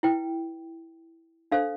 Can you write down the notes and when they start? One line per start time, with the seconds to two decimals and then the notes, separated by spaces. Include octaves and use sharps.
0.03 E4 B4 G5
1.52 D4 A4 C5 F5